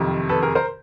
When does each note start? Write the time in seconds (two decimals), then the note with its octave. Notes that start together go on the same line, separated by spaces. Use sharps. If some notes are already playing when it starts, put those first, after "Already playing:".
Already playing: F#1 F2 C3 D#3
0.29 A4 B4
0.42 G#4 A#4
0.55 A#4 C5